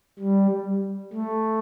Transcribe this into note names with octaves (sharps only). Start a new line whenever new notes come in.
G3
A3